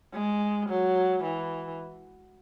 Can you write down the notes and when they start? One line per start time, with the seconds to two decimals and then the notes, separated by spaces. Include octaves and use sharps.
0.14 G#3
0.69 F#3
1.23 E3